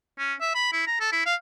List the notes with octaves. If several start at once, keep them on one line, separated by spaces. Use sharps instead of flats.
C#4
E5
B5
E4
A#5
A4
E4
F5